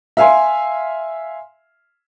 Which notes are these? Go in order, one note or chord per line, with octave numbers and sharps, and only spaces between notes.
E5 F5 G#5 C6